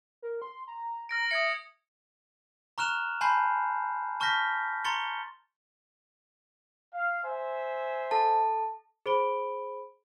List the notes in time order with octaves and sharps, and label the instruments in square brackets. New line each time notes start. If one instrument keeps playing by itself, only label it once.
[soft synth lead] A#4
C6
A#5
[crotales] F6 A#6 D7
[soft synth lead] E5 [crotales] D#6 G#6 C#7
[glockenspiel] A#5 C#6 F6 F#6 E7 F7
G#5 A5 B5 C6 G6 C7
A5 C#6 F6 G6 A#6 B6
A#5 C6 C#6 A6 C#7 G7
[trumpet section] F5
C5 E5 G#5
[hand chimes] A4 A5
[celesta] G#4 C5 B5 D7 G7